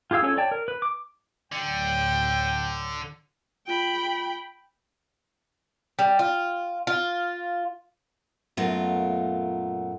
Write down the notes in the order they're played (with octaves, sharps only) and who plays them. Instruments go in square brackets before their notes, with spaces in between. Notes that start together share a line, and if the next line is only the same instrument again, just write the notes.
[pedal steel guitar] F4 G4 G#4 F5 E6
C#4 F4 A4 C#5 E6
C#5 D5 G5 A5
A#4
B4
D6
[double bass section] D2 A2 F#3 [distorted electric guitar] D3 [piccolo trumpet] G5
[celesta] F4 D7 [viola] G5 B5
[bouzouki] G3
F4
F4
[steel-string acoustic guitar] F#2 A#2 A3 B3 F4 A#4